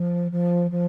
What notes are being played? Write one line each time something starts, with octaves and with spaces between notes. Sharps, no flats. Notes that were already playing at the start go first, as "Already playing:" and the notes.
Already playing: F3
F3
F3